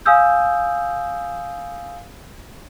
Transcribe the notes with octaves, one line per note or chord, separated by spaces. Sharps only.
F5 G#5 D#6 E6 G6